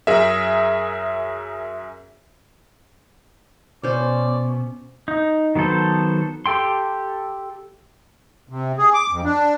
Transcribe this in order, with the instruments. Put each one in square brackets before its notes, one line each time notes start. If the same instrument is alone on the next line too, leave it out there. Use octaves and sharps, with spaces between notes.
[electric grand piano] F#2 G#4 A#4 E5
[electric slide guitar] B2 [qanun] C#4 C5 [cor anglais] D5
[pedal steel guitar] D#4
D#3 F#3 B3 A4 C5
G4 A4 G5 C6
[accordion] C3
G#4
D6
F2
D4